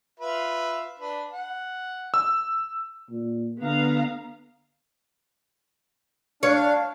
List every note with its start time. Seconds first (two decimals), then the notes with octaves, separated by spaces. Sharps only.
0.20 F4 B4 E5
1.00 D4 B4
1.32 F#5
2.14 E6
3.10 A#2
3.62 D3 B3 F5 A#5
6.43 D4 C#5 F5